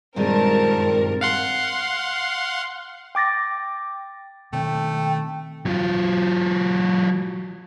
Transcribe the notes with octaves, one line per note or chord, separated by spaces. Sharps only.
G2 A#2 D#3 G#3 C4 A#4 A5
F5 F#5 C6
G5 D6 A6 A#6
B2 D#3 A3 C4 G5
F#3 F4